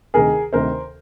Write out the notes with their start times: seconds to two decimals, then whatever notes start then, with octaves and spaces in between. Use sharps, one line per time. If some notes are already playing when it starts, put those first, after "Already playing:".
0.14 D2 C3 D#3 G#4 A#4
0.53 D2 C3 D#3 A#4 C5